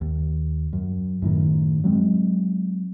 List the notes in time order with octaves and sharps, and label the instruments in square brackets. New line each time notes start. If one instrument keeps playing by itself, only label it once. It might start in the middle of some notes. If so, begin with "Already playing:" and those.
[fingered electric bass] D#2
F#2
F#2 A2 D#3
F#3 G#3 B3 C4